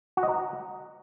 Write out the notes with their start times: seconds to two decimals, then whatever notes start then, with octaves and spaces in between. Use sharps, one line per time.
0.17 F#4
0.23 D#5
0.29 A#5